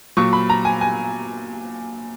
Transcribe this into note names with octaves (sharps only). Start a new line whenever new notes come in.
A#2 F#3 C#6
B5
A#5
G#5
G#5